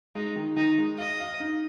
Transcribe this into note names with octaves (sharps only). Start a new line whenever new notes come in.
G#3 D#4
D#3
D#3 D#4
G#3
D#5 F5
F5
D#4